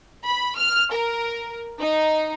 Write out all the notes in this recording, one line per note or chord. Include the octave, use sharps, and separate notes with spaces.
B5
F6
A#4
D#4